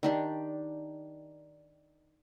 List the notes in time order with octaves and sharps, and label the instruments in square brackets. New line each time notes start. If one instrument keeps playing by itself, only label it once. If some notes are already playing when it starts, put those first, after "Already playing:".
[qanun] D#3 D4 G4